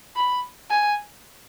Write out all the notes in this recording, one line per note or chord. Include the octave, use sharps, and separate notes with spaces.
B5
G#5